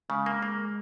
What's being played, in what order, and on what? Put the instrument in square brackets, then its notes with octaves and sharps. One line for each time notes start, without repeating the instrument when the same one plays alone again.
[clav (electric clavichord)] C#3 [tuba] G#3
[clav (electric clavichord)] A#3
A#3